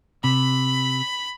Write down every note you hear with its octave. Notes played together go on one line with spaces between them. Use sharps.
C3 B5